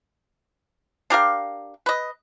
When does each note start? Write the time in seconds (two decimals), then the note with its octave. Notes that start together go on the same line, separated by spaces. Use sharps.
1.10 D4 G4 A#4 F5
1.86 B4 D#5